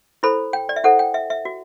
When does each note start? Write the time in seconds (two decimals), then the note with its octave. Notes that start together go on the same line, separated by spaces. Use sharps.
0.23 E4 A4 C5 B5
0.53 G5
0.69 D5
0.76 E5
0.84 E4 A4 C5 F#5
0.99 G5
1.14 E5
1.30 E5
1.45 F#4